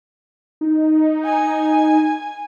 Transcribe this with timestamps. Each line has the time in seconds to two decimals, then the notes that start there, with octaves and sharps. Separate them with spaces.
0.61 D#4
1.25 G#5